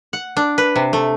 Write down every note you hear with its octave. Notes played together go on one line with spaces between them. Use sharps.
F#5
D4
B4
C3
A3